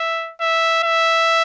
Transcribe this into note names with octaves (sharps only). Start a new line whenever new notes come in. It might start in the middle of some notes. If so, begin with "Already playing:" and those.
Already playing: E5
E5
E5